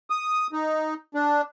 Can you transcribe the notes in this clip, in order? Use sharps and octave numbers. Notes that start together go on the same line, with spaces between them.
D#6
D#4
D4